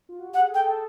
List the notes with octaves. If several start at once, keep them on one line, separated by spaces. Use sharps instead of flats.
F4
F#4
G4 F#5
G#4
A4
G5
A4